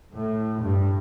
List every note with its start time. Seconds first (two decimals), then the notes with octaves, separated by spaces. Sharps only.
0.14 A2
0.63 G2